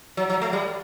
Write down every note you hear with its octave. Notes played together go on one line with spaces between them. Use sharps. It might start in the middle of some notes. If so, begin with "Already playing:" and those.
F#3
F#3
A3
G3